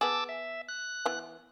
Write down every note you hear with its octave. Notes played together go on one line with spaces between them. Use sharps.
B3 G#4 A5 D6 E6
E5
F#6
E3 B3